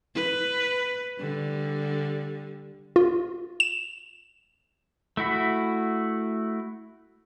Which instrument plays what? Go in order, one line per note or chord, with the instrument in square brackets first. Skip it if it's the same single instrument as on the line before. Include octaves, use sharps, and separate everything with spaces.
[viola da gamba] B4
D3 G3
[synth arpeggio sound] F4
E7
[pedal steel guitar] A3 E4 F#4 B5